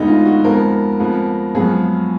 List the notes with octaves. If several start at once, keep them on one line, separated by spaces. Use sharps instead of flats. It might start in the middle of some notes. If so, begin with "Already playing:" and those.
Already playing: D2 D3 G#3 B3 D#4
F4
F#4
F2 F3 G#3 B3 A#4
F2 F3 G#3 B3
F#2 F3 G#3 B3 G#4